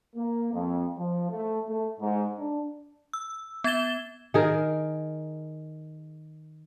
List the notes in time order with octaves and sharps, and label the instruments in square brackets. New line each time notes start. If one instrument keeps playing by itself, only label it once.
[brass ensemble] A#3
F2
F3
A3
A3
G#2
D4
[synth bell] E6
B3 G#6 A6 E7 G7
[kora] D#3 G#4 A#4